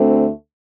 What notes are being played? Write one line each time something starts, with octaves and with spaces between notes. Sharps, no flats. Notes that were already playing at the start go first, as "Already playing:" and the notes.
Already playing: D2 D3 A3 C4